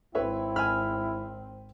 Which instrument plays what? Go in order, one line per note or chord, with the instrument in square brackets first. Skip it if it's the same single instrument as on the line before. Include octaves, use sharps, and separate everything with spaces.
[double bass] G#1 C4 [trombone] E4 [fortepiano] B4 C#5 E5
[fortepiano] G#5 B5 [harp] F6